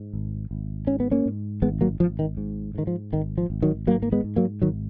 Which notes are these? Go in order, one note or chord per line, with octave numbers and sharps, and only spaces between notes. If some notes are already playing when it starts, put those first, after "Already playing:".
Already playing: G#2
G#1
G#1
G#2 C#4
B3
A#3 C#4
G#2
G#1 G#3 B3
F#3 A#3
G#1 F3
D#3
G#2
G#2 D#3
F3
G#1 D#3
F3
G#1
D#3 F#3
G#2 F#3 A#3
A#3
G#3 B3
G#2
F#3 A#3
G#1 D#3 F#3